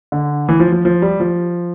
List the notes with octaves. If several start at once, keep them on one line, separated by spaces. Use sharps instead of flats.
D3
E3
F3
F3
F3
G3
F3